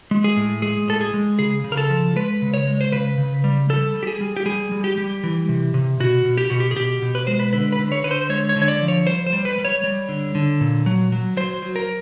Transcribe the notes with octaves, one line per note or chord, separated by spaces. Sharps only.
G#3
G#4
A2
G#3 G#4
A2 A4
G#4
G#3
C#3 G#4
C#3
A#4
A4
F3
G#3 B4
C#3
C#5
G#3
C5
C#3 B4
C#3
G3
G3 A4
G3
G4
G#4
G3
G4
G3 G#4
G3
G4
G3
E3
C3
C3
B2 F#4
B2
G4
B2 F#4
G4
G#4
B2 G4
B2
B4
G#3 C5
B4
D3 B4
B4
D3
C#5
D3 B4
C5
G#3 C#5
C#5
D3
C#5
D5
F3
C#5
G3 C5
C5
G3
B4
G3
C#5
G3
D3
D3
A#2
F#3
F#3
F#3 C5
F#3
A#4